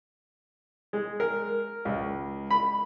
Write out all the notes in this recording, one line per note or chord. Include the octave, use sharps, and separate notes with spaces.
G#3
A#4
C#2
B5